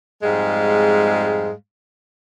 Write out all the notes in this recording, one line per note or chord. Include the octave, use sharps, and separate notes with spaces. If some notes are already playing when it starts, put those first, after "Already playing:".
F2 G#2 G3 G#3 F5